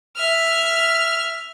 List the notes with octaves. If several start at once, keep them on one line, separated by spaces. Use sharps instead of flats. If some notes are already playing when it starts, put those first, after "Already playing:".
E5 F6